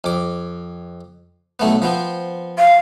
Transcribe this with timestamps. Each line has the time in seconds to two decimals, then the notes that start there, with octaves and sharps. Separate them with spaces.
0.04 F2 D6
1.60 B1 A3 B3
1.82 F3 B3 C4
2.58 F5